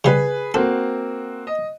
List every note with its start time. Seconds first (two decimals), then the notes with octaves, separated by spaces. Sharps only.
0.04 C#3 G3 G#4 B4
0.54 A#3 C4 F#4 A4
1.47 D#5